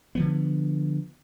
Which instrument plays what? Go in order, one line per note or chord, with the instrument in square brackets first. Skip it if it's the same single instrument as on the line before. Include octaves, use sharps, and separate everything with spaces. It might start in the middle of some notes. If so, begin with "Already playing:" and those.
[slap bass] D3 F3 B3